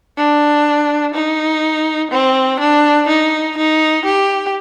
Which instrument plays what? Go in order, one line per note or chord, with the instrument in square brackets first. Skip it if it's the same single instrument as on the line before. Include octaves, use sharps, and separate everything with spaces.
[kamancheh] D4
D#4
C4
D4
D#4
D#4
G4